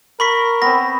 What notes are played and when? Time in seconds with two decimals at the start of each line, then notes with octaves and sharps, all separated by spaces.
0.20 A#4 B5 C#6 B6
0.62 B3 C4 A#6